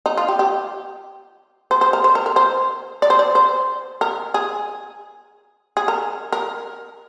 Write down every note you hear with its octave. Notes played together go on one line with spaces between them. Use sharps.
D#4
F4
G4
G4
C5
C5
A#4
C5
A#4
A#4
C5
D5
C5
D5
C5
A#4
G#4
G#4
A#4
A#4